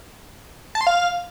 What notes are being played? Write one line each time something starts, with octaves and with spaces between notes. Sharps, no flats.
A5
C6
F5